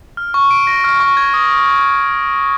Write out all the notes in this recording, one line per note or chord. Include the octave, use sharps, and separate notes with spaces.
F6
C#6
D7
A#6
F6
C#6
G#6
D#6